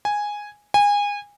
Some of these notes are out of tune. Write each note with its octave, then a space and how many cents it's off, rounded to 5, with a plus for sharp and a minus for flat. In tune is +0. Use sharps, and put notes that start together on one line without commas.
G#5 -5
G#5 -25